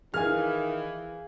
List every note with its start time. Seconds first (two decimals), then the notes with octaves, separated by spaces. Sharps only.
0.14 D#3 E3 G#4 F5 G#5 F6